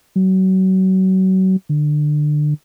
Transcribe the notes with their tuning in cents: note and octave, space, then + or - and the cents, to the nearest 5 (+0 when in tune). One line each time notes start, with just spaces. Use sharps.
F#3 +30
D3 +25